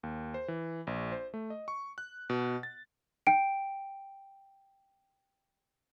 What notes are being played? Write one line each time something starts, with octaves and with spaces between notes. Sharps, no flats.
D#2
C5
E3
A#1
C5
A3
D#5
C#6
F#6
B2
A6
G5 D7